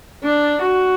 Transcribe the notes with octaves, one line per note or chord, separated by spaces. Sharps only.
D4
F#4